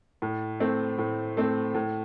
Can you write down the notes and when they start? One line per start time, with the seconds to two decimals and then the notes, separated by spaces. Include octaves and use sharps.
0.22 A2
0.60 A3 C4
0.98 A2
1.37 A3 C4
1.74 A2